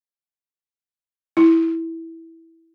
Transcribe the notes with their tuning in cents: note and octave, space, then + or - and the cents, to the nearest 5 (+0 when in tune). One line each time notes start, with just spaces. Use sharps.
E4 -10